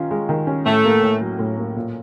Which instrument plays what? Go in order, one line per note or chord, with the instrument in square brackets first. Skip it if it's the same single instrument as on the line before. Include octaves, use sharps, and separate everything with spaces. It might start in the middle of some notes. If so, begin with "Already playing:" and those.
Already playing: [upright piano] D#3 C#4 F4
G#3
D#3
C#4
[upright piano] A2 [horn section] A3
[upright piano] A#3
A2
F#3
A2
A#3
A#2